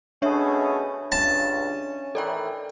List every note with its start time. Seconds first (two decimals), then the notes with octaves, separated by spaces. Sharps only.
0.22 B2 A3 C#4 D4 G#4 C#5 E5
1.12 C#2 G2 C#4 A5
2.15 A2 D#3 E3 A4 D5 G5